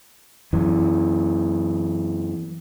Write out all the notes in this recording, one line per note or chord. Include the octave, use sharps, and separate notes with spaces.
F#2 E3